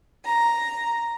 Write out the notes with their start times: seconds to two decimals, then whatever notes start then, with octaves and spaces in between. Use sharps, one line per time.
0.24 A#5